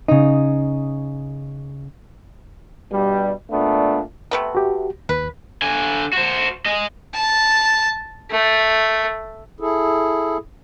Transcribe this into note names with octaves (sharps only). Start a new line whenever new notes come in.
C#3 D#4
G2 B2 G3
A#2 A3 B3 D4
C3 A3 B3
F#4 G4
D#2 B4
D3 G#5
F#4 C5
G#4 D#5
A5
A3
E4 G#4 A4